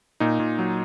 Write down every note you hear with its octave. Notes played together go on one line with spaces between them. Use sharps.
A#2 D#4
A#2
F#3